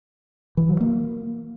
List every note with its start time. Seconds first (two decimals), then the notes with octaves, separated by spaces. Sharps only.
0.57 E3
0.69 F#3
0.81 A#3